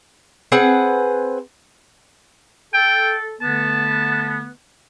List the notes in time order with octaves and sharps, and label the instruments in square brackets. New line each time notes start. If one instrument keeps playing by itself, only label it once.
[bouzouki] C4 G#4 B4 F#5
[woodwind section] A4 [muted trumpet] G5
[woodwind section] D3 A3 B3 [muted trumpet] A5